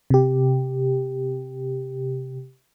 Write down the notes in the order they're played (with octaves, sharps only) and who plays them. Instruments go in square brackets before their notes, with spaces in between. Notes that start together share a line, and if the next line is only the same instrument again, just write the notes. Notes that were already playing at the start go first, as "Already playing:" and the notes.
[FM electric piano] C3 G4